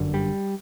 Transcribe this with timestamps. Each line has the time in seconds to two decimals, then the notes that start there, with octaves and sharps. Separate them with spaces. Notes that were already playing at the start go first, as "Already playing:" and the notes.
Already playing: G1 F#2 D3
0.14 G3